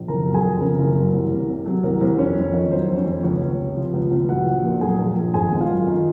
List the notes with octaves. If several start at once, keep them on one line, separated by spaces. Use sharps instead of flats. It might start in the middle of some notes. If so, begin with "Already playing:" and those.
Already playing: A#1
F#1 A#4 A#5
F#3
G#4 G#5
F2
C#3 A#4
F#1
F#3
C2
C2
C3
F#3
C2 A#4
C2 C5
F2 C#4 C#5
F2
D#3
F#3 C5
F2
C#4 C#5
F2
C#2 C#4 C#5
C#2
C3
F3
C#2
C#2
A#1 F#4 F#5
A#1
A#2
F#3 G#4 G#5
A#1
A#1
G#1 G#4 G#5
G#3
F4 F5
F#2
D#3